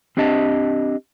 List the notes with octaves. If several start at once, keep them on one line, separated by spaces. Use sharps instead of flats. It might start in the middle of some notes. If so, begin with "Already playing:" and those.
C4 D4 G4 D#5 A5